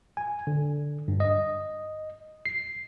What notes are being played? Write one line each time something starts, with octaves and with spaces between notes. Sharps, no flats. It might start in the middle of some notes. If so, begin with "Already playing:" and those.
G#5
D3
G2
D#5
C7